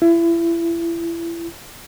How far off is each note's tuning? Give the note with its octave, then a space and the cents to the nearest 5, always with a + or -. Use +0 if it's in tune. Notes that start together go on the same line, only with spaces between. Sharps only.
E4 +30